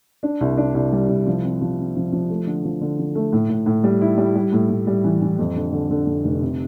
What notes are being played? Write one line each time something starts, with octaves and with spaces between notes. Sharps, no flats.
D4
C2
D4
C2
G3
C2
F3
C4
F3
C4
F3
F3
A3
D3
F3
D3
F3
A3
A2
A2
A2
G3
E4
G3
G3
A2
A2
G3
E3
E3
F2
D3
D3
D3
F2
F1
C3